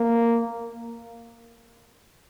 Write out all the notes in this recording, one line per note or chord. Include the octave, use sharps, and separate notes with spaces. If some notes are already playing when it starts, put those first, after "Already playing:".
Already playing: A#3